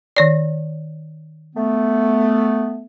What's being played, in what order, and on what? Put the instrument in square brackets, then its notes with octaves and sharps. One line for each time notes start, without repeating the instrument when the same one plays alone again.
[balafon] D#3 C#5 D5
[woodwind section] A3 B3